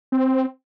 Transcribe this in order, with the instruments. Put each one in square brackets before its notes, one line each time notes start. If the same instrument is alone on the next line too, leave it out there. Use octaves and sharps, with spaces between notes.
[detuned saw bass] C4